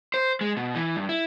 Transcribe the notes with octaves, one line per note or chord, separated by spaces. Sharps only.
C5
G#3
B2
E3
G2
E4